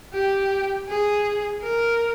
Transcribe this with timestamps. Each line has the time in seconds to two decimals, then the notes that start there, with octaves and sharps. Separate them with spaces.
0.14 G4
0.89 G#4
1.63 A#4